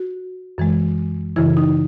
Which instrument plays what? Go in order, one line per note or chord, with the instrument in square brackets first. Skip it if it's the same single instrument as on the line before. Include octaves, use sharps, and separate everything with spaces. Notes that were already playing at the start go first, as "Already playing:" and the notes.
Already playing: [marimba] F#4
F#2 E3 G#3
F#2 C#3 E3 E4
D#4